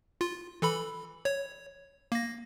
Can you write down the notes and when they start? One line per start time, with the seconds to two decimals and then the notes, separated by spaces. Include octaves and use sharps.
0.21 F4
0.62 E3 A4 B5
1.25 C#5
2.12 A#3 A#6